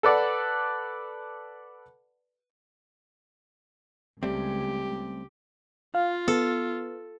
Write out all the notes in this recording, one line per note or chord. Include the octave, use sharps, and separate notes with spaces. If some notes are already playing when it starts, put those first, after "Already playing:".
A4 B4 D5 F#5
C#2 G3 A3 C4 G4
F4 F5
B3 A4